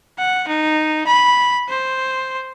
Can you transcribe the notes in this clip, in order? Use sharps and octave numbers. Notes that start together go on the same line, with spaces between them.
F#5
D#4
B5
C5